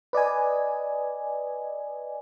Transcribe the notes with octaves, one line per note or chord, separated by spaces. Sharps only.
B4 D5 D#5 G#5